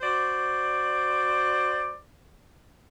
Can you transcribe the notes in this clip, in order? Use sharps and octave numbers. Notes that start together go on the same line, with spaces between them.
F#4 C5 D5